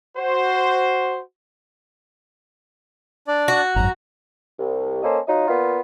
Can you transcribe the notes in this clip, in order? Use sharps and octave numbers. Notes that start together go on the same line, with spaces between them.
F#4 C5
D4 D5
F#4
G#1 F#2 A#5
C2
A#3 C#4 A4 C5 D#5
F#3 D#4 F4 D#5
A#2 B3 F4